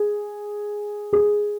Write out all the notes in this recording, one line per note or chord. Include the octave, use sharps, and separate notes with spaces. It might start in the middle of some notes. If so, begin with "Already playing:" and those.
Already playing: G#4
G#4